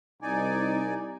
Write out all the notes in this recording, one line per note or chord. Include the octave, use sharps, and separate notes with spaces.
C2 D#4 D5 G#5